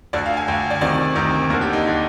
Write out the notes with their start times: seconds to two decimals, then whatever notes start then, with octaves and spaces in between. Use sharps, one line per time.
0.13 D2 D3 D5
0.26 F5
0.37 G#5
0.48 D2 D3 G5
0.70 D5
0.81 D2 C3 D#3 D5
1.15 D2 C3 D#3
1.50 D#2 A#4
1.53 D3
1.61 G4
1.73 D#4
1.87 D3